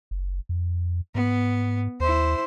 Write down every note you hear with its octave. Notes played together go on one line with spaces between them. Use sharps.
F#1
F2
G#2 B3
D#2 E4 C5